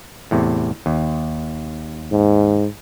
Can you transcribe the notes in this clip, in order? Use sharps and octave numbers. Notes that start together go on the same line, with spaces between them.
E2 A2 C3
D#2
G#2